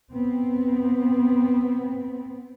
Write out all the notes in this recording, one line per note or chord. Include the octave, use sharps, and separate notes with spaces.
B3 C4